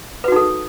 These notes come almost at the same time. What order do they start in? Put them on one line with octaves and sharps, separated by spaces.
B4 F#4 D#4 A4